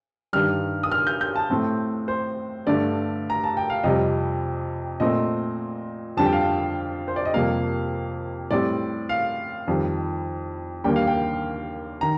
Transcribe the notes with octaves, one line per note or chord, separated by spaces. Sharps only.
G2 D#3 G3 F6
D#6
F6
G6
G6
A5
A2 A3 C4
C5
G2 D3 A3 D5
A#5
A5
G5
F5
F2 C3 G3 D#5
A#2 A3 C4 D#5
F2 D3 G3 A5
G5
F5
G5
C5
D5
D#5
F2 C3 G3 A#3 F5
A2 G3 C4 D5
F5
F2 D#3 G3
D#2 D3 G3 A#3 G5
F5
G5
D#3 A#5